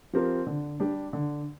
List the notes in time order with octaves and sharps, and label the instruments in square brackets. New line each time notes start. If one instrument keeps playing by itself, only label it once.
[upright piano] F3 C4 G4 A#4
D3
G3 D4 G4
D3